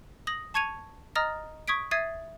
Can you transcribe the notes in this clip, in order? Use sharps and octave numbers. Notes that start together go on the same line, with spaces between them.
D#6 A#6 F#7
A5 C#6 G#6 C#7 D#7 F7
D#5 A#5 D#6 F6 A6 A#6
C#6 D#6 G#6 B6 D7
E5 D#6 G#6 A6 C7 D#7